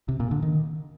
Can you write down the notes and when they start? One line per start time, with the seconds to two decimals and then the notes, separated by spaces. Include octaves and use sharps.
0.09 C3
0.20 A#2
0.31 D3
0.43 D#3